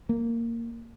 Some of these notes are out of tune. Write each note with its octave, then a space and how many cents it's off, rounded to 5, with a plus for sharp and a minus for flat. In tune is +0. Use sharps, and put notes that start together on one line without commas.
A#3 -10